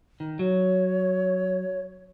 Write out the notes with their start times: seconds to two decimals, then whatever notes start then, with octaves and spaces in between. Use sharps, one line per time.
0.20 D#3
0.39 F#3 C#5